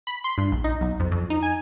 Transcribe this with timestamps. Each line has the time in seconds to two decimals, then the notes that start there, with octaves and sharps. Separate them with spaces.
0.07 B5
0.24 C6
0.38 G2
0.52 A#1
0.64 D#4
0.81 B1
1.00 F2
1.12 F2
1.30 D#4
1.42 G#5